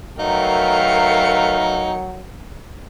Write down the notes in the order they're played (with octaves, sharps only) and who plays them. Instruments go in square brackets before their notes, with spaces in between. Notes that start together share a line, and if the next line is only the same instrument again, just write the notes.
[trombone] F#3 [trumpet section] A3 B4 F5 [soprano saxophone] D#4 [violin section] A#4 G5 C#7